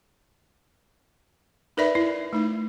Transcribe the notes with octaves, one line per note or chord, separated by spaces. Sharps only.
D#4 A#4 B4 D5 E5 B5
E4
A3 D#4